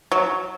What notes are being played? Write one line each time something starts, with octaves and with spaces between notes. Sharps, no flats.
F#3